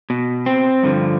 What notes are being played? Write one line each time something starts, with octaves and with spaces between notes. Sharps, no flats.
B2
C4
G2 D3 F3